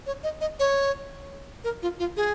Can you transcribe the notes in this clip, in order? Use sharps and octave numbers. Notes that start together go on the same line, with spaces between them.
C#5
D#5
D#5
C#5
A#4
F4
F4
G#4